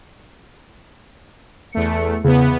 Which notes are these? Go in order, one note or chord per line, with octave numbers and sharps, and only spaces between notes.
E2 A3 C#7
E2 C#3 B3